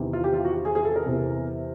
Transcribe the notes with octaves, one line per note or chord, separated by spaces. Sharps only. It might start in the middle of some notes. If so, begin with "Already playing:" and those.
Already playing: E2 C3 D#3
F4
G4
F4
F#4
G#4
G#4
A4
A#4
E2 C3 E3